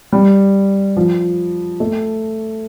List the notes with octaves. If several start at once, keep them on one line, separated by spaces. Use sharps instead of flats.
G3
F3
A3